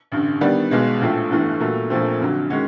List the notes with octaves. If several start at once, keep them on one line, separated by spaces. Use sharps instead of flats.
A1 G2 D3
D#3 G3 B3 D4
B1 B2 G#3
A#1 A2 F3 A3
G1 G2 E3 A3
A#2 F#3 A3
A#1 A#2 F3 A3 C4
F1 F2 D3 F#3
D#3 G#3 C#4 F#4